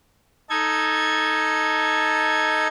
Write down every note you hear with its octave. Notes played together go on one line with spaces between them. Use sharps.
D#4 A4 G#6